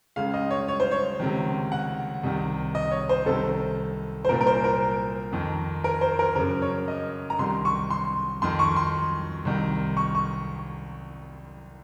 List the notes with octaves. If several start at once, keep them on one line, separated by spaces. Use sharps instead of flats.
C#2 C#3 F5
D#5
C#5
C#5
C5
C#5
C#2 C3 D#3
F#5
C2 C3 D#3
D#5
C#5
C5
C2 C3 D#3 A4
C5
C2 A#2 A#4
A#4
C5
A#4
F2 D#3
A#4
C5
A#4
F#2 C#3 A#4
C#5
D#5
A#5
C2 C3 D#3 C6
C#6
C6
F2 D#3 C6
C#6
C6
C2 C3 D#3
C#6
C#6